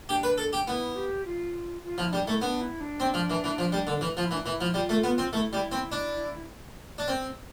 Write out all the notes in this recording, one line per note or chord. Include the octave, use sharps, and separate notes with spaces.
D4 G4
B4
A4
G4
B3 E4
G4
F4
F4
F3 E4
G3 D4
A3 E4
B3 D4
E4
D4
C4
F3
E3
E3
F3
G3
D3
E3
F3 F4
E4
E3
D4
E3 E4
F3
G3 F4
A3
B3
C4
A3 E4
G3 E4
C4 E4
D4
D4
C4